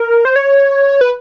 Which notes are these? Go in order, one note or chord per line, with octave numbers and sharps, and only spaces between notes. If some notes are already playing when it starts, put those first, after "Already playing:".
Already playing: A#4
C5
C#5
B4